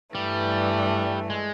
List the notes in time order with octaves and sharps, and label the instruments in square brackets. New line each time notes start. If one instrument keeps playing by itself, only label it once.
[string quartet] G2 E3 A3 [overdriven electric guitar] G3
[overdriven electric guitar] G#3